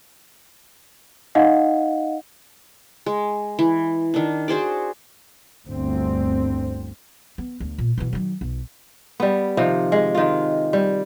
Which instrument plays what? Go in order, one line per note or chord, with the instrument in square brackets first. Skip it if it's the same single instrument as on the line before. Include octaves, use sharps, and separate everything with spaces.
[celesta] D#4 D#5 F5 F#5
[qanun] G#3
E3
D#3 D4
F#4 G#4 C5 D5
[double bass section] G1 D2 C4
[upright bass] B3
D2
A#2
B2 E3
D#3 F#3
B1
[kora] G3 B3
C3 D#3 F3
G#3
D#3 F4
G3